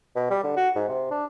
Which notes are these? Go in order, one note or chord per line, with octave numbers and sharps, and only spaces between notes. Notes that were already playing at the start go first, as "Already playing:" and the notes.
B2
G3
D3
F#4
G#2
C3
D4